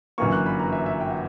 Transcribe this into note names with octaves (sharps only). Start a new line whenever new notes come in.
G1 F#2 E3 A#3 C#6
F#6
B5
A#5
E5
E5
G5
F#5